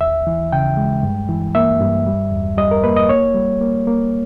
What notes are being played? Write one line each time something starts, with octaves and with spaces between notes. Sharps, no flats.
D#2 E5
E3
C#3 G5
G#3
G2
E3
A#3 E5
G2
G3
E2
G3 D#5
A#4
A#3 B4
D#5
A#3 C#5
G3
A#3
A#3